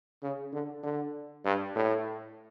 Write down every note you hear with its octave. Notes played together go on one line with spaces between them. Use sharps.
C#3
D3
D3
G2
A2